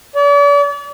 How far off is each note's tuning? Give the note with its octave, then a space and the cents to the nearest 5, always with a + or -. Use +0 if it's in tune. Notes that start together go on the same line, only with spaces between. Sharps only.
D5 -40